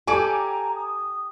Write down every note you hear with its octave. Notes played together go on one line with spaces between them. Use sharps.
G4 A4 D5 G#5 D6 D7
A#5
D#6